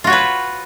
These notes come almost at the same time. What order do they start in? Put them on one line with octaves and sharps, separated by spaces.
F4 F#4 C#5 B4